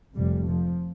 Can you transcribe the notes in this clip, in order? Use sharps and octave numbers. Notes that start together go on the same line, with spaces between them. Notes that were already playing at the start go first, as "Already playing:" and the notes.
F1 F2 C3 G3
F3